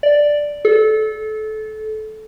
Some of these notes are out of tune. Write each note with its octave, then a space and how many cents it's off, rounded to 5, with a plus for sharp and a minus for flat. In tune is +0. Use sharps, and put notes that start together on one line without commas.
D5 +0
A4 -25